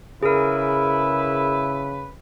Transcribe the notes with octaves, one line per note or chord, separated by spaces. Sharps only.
C#3 E4 G#4 A#4 B4